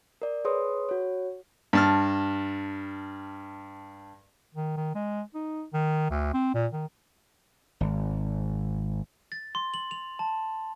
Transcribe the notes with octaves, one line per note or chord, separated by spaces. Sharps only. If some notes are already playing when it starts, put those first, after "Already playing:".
A#4 D5
G#4 B4 C#5 C6 D#6
F#4 C#5
G2 A5 F6
D#3
D#3
G#3
D#4
D#3
D2
C4
A#2
D#3
G#1
A6
C6
F#7
F7
A5